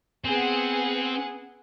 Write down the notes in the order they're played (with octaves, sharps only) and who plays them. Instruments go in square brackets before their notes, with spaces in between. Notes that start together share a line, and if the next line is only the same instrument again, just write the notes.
[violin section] B3 G#4 F#5 [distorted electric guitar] C4